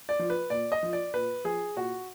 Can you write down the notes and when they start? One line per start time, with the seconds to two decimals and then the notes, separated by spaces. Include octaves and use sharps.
0.09 D5
0.19 F3
0.30 B4
0.50 A#2 D5
0.72 D#5
0.83 F3
0.93 D5
1.14 A#2 B4
1.44 F3 G#4
1.76 A#2 F#4